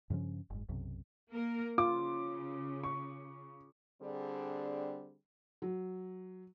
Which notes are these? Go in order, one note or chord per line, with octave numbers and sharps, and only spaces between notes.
G2 C#3 F3 C#4
F#1 G#2
B1 F#2 C3
A#3 A#4
C#3 F4 D6
C#6
D3 G3 C4 D4 G#4
F#3